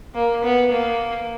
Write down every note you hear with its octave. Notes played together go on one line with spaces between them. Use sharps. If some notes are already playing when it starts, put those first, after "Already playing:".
A#3
B3
A#3